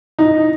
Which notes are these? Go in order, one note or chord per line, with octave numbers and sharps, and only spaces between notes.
D#4